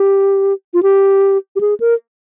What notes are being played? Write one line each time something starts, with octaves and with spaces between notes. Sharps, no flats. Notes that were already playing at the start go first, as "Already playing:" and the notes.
Already playing: G4
F4
G4
G4
G#4
A#4